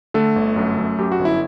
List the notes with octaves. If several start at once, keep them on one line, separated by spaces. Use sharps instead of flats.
D3 A3 A4
G1
F#2
F#2
F#2 G4
F#4
G1
E4